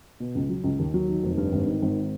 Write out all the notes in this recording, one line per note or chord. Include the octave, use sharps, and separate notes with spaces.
B2
C#2
F#3
C#2
D#2
F#3
D#3
F1
G2
G#1
D#3
G#1